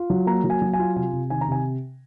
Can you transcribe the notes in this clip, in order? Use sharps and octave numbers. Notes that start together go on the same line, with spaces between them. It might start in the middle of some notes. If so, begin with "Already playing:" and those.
Already playing: F4
F#3
A#3 A#5
F#3
G#5
F#3
G#5
F4
C3 G#5
C3
D#3 G#5
A#5
C3 G#5